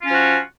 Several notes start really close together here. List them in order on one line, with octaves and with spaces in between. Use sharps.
F4 C#4 F3 F#4